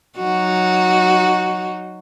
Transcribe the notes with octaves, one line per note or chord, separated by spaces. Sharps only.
F#3 D#4 F#4